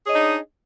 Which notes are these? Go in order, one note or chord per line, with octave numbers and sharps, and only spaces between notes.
D4 D#4 G#4 C#5 D#5